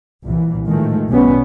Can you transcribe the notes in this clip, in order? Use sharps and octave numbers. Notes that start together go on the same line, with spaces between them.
C2 A#2 E3
A2 D#3 F3 G#3 A3
B1 B2 G3 B3 C#4